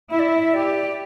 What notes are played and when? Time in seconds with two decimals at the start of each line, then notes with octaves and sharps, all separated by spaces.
0.11 E4 E5
0.19 D5
0.28 E5
0.54 G4 D5